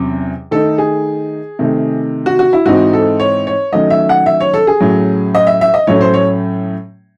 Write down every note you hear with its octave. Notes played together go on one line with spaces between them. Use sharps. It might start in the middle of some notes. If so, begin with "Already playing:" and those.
Already playing: E2 C3 F#3 C#4
D#3 A3 D#4 A4
G#4
C3 D#3 A3
F#4
F#4
E4
G#2 E3 C4 D#4 F#4
A4
C#5
C#5
D#3 F#3 A3 C#4 D#5
E5
F#5
E5
C#5
A4
G#4
A2 F#3 C#4
D#5
E5
E5
D#5
A2 F#3 A3 C#4 C#5
C5
C#5